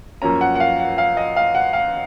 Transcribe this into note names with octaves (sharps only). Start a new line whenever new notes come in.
F#2 F3 A#3 C#4 A#5
F#5
F#5
F5
F#5
F5
D#5
F5
F#5
F5